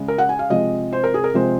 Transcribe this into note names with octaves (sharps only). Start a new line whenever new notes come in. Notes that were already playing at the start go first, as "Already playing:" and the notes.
Already playing: C#3 G#3
A#4
F#5
G#5
F5
C3 F3 G#3 D#5
C5
A#4
G#4
A#4
C3 F3 G#3 C5